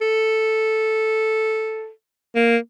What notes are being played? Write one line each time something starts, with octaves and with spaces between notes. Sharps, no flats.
A4
A#3